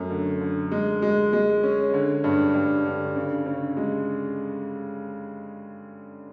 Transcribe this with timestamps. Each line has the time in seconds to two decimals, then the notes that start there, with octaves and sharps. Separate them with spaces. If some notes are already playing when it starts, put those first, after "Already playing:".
Already playing: F#2 A3
0.10 D3
0.41 D3
0.71 G#3
1.02 G#3
1.33 G#3
1.63 C#4
1.94 D3
2.24 G2
2.54 G2
2.85 D3
3.16 C#3
3.46 C#3
3.77 G#3